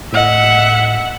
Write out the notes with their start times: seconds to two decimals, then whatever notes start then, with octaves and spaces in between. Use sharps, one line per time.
0.12 A2 D#5 E5 F#5